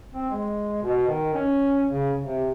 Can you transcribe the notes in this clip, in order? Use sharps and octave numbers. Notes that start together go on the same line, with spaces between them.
C4
G#3
B2
D#3
C#4
C#3
C3